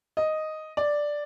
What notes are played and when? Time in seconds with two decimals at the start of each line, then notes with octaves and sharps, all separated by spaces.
0.17 D#5
0.77 D5